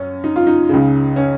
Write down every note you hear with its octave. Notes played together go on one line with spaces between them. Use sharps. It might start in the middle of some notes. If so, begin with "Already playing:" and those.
Already playing: F#2 C#4
D#4
F4
D#4
C#2 C#3
C#4